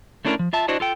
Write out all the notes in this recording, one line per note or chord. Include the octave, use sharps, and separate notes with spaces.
A3 C#4 D4 E4 A4 A#4
F3
F4 E5 A5
D4 E4 F#4 C5 D#5
F4 A4 G5